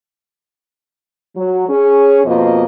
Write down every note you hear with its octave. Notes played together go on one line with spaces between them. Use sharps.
F#3
C#4 G#4
F2 B2 A#3 F4 C5 D#5